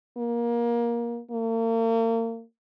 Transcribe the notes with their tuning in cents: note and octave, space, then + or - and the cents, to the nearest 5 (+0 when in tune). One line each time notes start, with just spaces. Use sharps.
A#3 +20
A#3 -40